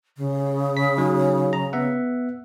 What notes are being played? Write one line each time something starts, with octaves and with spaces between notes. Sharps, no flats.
C#3
B6
F#3 D#4
A#5
B3 E5 F#5